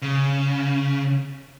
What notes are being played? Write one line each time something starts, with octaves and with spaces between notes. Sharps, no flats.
C#3